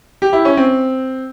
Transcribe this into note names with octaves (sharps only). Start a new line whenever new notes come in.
G4
E4
C#4
C4